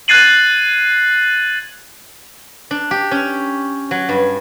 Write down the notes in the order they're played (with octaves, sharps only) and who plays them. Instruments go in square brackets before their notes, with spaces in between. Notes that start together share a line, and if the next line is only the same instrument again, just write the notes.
[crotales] F#6 G#6 A6 C7 D#7 F#7
[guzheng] D4
G4
C#4
F#3
G2